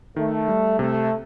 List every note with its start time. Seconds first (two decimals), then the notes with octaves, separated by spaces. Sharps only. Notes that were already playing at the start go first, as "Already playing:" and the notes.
0.16 D#3 A3
0.48 G3
0.79 C3 A3